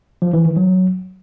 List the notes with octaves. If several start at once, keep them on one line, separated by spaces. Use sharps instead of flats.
F3
E3
D#3
F#3